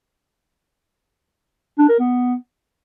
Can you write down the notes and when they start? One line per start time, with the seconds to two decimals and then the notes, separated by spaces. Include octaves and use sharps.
1.78 D4
1.89 A#4
1.99 B3